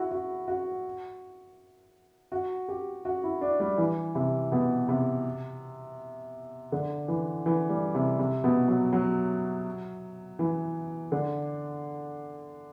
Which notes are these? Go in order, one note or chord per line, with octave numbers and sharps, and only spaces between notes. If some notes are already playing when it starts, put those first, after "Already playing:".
Already playing: E4 F#4
F#4
F#4
F#4
G4
F#4
E4
D4
G3
E3
C3
B2
C3
D3
E3
E3
G3
C3
C3
B2
F#3
F#3
E3
D3